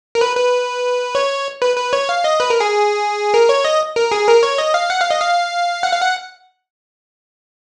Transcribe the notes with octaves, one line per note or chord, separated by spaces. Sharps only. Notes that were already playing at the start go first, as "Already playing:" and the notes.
A#4
B4
B4
C#5
B4
B4
C#5
F5
D#5
B4
A#4
G#4
A#4
C#5
D#5
A#4
G#4
A#4
C#5
D#5
F5
F#5
F5
D#5
F5
F#5
F5
F#5